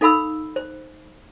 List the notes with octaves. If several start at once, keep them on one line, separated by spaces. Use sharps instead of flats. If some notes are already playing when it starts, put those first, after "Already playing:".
D#4 A4 F5 B5 E6
C5